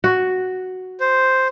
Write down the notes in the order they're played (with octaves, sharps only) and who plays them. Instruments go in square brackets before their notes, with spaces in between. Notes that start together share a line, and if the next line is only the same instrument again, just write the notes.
[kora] F#4
[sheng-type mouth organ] C5